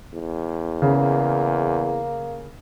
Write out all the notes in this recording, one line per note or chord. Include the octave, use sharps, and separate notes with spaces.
E2
C#3 A#3